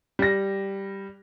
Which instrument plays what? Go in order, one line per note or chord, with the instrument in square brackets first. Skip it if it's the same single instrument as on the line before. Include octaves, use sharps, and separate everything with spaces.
[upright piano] G3 A#6